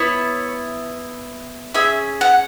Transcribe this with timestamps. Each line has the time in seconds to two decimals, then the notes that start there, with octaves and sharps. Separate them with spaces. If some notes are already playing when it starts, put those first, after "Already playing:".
Already playing: B3 E4 C#5
1.74 C#4 G#4 E5
2.21 F#5